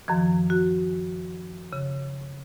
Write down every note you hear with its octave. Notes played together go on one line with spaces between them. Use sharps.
F#2 D#3 F3
F#4
C#3